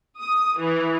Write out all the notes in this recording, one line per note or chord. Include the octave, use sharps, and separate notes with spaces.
D#6
E3